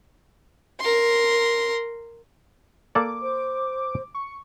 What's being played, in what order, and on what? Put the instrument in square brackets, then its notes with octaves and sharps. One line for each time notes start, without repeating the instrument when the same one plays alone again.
[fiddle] A#4 C6
[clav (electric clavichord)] A#3 A4 D5 [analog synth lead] D6
[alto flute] C5
[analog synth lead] C#6